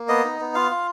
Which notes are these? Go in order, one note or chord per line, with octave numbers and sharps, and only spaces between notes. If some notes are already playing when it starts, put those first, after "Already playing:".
Already playing: A#3
B3 D#5
D#4
B3
F4 F5
F4